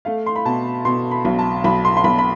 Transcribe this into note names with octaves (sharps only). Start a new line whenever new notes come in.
A3 F5
C6
B5
B2 A5
B2 C6
B5
B1
A5
B1 B5
C6
C6
B1 B5
B5